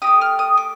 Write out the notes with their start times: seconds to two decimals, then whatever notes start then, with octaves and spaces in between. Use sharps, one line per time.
0.02 D#4 G4 D#6
0.07 A3
0.21 F6
0.39 D#6
0.57 D6